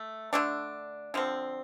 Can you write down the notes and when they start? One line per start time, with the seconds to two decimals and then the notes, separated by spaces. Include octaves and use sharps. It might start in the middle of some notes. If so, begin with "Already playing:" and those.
Already playing: A3
0.33 D3 A3 D4
1.14 D3 F3 C4